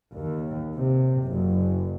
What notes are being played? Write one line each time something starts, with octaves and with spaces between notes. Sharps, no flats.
D#2
C3
F#1